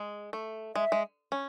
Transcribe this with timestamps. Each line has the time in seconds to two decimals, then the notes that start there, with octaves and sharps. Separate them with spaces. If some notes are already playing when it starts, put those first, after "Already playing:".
Already playing: G#3
0.33 A3
0.75 G#3 E5
0.92 G#3
1.32 C#4